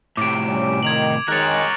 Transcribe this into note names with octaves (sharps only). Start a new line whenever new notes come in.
A2 C3 D6 D7
G3 C#4
D#3 G#6 F7 F#7
D#3 G#3 A#4 C#5 F#6 A6